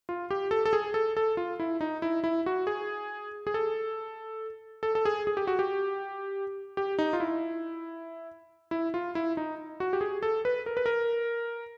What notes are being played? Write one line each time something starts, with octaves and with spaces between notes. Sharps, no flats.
F4
G4
A4
A4
G#4
A4
A4
F4
E4
D#4
E4
E4
F#4
G#4
G#4
A4
A4
A4
G#4
G#4
G4
F#4
G4
G4
D#4
F4
E4
E4
F4
E4
D#4
F#4
G4
G#4
A4
B4
A#4
B4
A#4